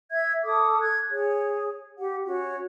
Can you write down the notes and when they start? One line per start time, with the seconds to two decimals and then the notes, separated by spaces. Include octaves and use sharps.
0.11 E5 G#6
0.44 A4 D6 D#6
0.81 F#6 G#6
1.11 G#4 C#5
1.98 G4 F#5
2.26 C#4 F#4 C#5